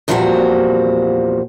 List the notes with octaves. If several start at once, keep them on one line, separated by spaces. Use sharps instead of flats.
E2 A#2 F3 G3 C4 F#4